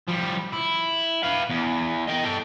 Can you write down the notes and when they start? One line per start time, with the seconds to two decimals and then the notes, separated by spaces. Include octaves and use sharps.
0.08 F3 G3
0.53 E4
1.23 B4 F5
1.49 E2
2.07 D#5 G5
2.24 A4 G5